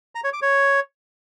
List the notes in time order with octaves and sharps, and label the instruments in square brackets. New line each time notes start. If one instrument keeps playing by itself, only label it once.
[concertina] A#5
C#5
D6
C#5